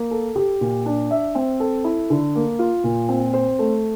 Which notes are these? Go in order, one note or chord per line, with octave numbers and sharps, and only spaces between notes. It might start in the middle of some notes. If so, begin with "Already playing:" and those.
Already playing: A#3
A4
G4
A#2
D4
E5
C4
A4
E4
D3
A#3
F4
A#2
C4
C5
A3